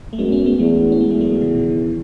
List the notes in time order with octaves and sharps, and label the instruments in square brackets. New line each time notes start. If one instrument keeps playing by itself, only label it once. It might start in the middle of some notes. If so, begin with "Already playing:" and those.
[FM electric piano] A3
[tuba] F#2 [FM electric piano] G#3 B3
[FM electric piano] A3 C#4
G#3 B3
[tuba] E2 [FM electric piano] F#3 A3
[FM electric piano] C#4
[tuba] E2 [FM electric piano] G#3 B3
[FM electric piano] F#3 A3
F#3 A3
F#3 A3
C#3
B2 D#3
C#3 E3